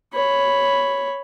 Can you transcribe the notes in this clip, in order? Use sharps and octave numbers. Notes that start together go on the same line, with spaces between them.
C#5 B5